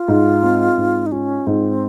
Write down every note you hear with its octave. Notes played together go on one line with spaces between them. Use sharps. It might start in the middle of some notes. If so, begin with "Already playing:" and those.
Already playing: F4
G#2
C4
G#2
D#4
C#4 F4
G#2 C4